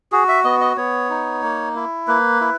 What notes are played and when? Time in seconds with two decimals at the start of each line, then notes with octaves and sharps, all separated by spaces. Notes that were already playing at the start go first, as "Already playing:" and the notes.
0.12 F#4 G#4
0.29 E5
0.44 B3 D#5
0.61 D#5
0.77 B3 C#5
1.10 D#4
1.43 A#3
1.75 E4
2.08 A#3 B4
2.41 E4